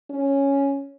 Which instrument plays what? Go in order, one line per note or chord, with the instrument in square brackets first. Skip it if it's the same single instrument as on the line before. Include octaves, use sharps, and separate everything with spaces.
[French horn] C#4